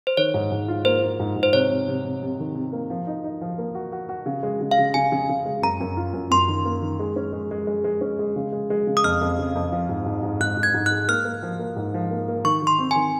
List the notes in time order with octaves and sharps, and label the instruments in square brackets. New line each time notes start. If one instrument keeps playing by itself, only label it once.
[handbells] C5
[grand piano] D#3 [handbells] C#5
[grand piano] G#2
G#2
F4
[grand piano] A#3 [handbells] C5
[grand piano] F4
G#2
G#2
[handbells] C5
[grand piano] C3 [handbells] C#5
[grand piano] C3
C3
C3
C3
D#3
C3
A#3
F3
D#4
D#4
F3
A#3
F#4
F#4
F#4
C#3
G#3
C#3
[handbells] F5
[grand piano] C#3
[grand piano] C#3 [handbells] G#5
[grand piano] C#3
C#3
G#3
[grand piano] F#2 [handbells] A#5
[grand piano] F#2
F4
F#2
[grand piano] F#2 [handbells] C6
[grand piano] D#3
A#3
D#3
G#3
C#4
G#3
G#3
G#3
G#3
C#4
G#3
C#3
G#3
G#3
C#3
[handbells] D#6
[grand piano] F2 [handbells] F6
[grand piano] F2
C#3
F2
F3
G#2
G#2
G#2
[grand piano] G#2 [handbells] F#6
[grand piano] G#2
[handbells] G#6
[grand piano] G#2
[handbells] F#6
[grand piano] G#3
[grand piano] A#3 [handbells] F6
[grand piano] A#3
F3
A#3
G#2
F3
A#3
A#3
[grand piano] D#3 [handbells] C#6
[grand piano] D#3
[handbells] C6
[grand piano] C4
[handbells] G#5
[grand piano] D#3